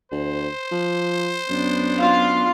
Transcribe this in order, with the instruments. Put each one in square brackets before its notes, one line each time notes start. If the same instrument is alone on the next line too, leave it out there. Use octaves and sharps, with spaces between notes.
[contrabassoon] D2 [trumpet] C5
[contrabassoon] F3
[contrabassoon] F#2 [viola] B3 D4
[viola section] F4 F5